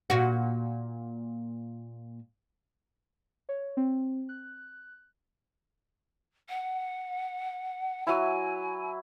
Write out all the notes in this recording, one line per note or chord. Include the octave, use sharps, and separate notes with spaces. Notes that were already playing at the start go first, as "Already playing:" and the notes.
A#2 F#4
C#5
C4
F#6
F#5
F#3 E4 G#5